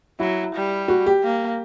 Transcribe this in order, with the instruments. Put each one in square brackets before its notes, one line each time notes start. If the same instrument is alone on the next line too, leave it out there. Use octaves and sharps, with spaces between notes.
[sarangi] F#3 [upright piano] E4
[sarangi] G3
[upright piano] F#4
G4
[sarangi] A#3